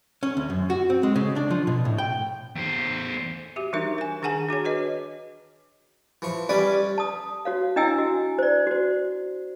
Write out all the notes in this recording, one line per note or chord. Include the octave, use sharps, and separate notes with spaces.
C#4
D2
F#2
F#4
C4
G#3
C#3
D4
F3
B2
A2
G5
E2 C5
F#4 G4 E5
E3 G3 D4 D#4 A#4 E5
A#4 G#5
D#3 D4 G#4 F#5 G#5 A5
D4 F#4 G#4 C#5
F#4 B4 D#5
E3 F3 C#6
G3 C#4 B4 D5
A5 D#6
F#4 C#5 F5
D4 E4 D#5 G5 G#5 E6
F#4
C5 D5
F#4 C5